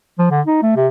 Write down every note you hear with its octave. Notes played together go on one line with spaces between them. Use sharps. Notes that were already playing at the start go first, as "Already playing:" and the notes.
F3
D3
D#4
A3
C3